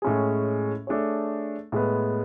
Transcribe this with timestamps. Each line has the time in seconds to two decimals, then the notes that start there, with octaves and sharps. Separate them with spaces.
0.02 A2 G#3 C#4 G#4
0.87 A3 D4 G#4 C#5
1.72 A2 G#3 B3